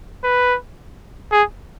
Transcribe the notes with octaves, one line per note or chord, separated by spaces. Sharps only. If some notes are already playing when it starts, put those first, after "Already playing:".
B4
G#4